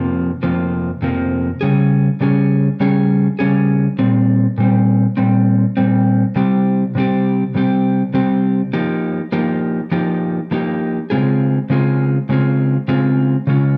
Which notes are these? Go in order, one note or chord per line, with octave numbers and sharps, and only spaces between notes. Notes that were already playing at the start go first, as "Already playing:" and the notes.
Already playing: F2 C3 F3 A#3
F2 C3 F3 A#3
F2 C3 F3 A#3
C#3 G3 C#4 G#4
C#3 G3 C#4 G#4
C#3 G3 C#4 G#4
C#3 G3 C#4 G#4
A#2 G3 C4
A#2 G3 C4
A#2 G3 C4
A#2 G3 C4
C3 G3 C4 G4
C3 G3 C4 G4
C3 G3 C4 G4
C3 G3 C4 G4
F3 A#3 D#4 G4
F3 A#3 D#4 G4
F3 A#3 D#4 G4
F3 A#3 D#4 G4
C#3 G#3 C4 F4 G#4
C#3 G#3 C4 F4 G#4
C#3 G#3 C4 F4 G#4
C#3 G#3 C4 F4 G#4
C#3 G#3 C#4 F4